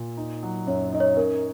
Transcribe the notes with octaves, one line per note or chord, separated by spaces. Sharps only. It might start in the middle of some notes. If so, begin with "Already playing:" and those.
Already playing: A#2
D#4
F#3
F#2 C#5
D#4 D#5
C#5
C#4 A#4